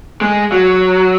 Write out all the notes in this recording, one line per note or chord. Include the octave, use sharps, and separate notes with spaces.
G#3
F#3